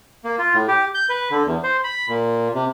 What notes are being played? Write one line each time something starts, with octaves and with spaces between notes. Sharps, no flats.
A#3
F4
A2
G4
G6
B4
D3
E2
C5
B5
A#2
C3